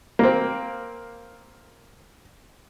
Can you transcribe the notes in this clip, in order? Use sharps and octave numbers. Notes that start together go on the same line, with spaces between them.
A#3 C4